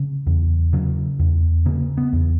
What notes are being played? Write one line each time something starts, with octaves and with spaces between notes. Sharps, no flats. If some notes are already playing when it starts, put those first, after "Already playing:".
Already playing: C#3
E2
C#3 F#3
E2
C#3 A#3
B3
E2